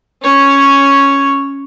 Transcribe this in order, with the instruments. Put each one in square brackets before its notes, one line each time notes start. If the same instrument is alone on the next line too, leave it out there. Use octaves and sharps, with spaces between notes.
[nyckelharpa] C#4 C#5